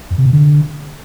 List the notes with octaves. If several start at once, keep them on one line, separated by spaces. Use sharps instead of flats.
F2
C3
B2
D3